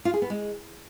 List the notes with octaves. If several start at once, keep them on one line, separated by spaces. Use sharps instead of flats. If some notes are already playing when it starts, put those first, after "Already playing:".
F4
G#4
B3
G#3